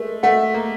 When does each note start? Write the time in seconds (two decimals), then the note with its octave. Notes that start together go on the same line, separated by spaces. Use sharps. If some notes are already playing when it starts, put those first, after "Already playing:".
Already playing: G#3 A3 A#4
0.23 A3 F#5
0.54 A#3